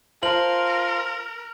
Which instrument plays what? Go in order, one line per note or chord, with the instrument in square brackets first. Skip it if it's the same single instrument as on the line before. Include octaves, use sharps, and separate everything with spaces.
[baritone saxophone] F4 [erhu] A#4 [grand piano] C5 A5 [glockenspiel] F#7